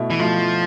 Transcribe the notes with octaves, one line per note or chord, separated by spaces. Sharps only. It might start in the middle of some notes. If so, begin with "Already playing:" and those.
Already playing: B2 A3 E4
E3
B2 F3 A3 E4